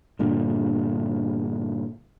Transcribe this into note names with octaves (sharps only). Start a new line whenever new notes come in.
G2 A#2 D3